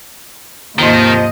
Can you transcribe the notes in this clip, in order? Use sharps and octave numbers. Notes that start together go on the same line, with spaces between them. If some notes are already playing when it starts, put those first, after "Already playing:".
D#2 G#2 C3 D#3 F3 A#3 D#5